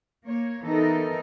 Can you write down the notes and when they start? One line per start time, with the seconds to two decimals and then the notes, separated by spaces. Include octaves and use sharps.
0.24 A#3 C#5
0.64 E3 B3 D#4 A4 A#4